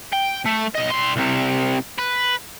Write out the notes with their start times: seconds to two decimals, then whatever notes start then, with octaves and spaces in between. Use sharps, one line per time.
0.13 G5
0.46 A3
0.75 B1 D#5
0.90 G3 C6
1.16 C2 C3
1.99 B4